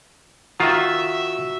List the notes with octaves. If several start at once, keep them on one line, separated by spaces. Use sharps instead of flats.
D#3 F4 F#4 E5